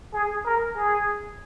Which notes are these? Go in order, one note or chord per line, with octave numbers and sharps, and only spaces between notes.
G#4
A#4
G#4